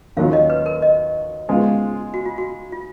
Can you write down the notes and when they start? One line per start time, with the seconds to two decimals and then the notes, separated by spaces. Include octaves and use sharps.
0.17 D#2 D#3 F#3 C#4 F4 F5
0.33 D#5
0.50 B4
0.66 A#4
0.82 D#5
1.48 C#3 G#3 B3 F4
2.14 F#4
2.25 F4
2.38 F#4
2.72 F4